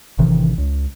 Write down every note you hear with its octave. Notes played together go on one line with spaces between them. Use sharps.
A1 C3 D#3 E3
C#2